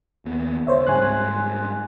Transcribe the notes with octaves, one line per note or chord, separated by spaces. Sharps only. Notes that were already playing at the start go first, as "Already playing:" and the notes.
D#2 B3
C#2 C5 C#5 E5
G#2 G3 C4 G#5 C6 F#6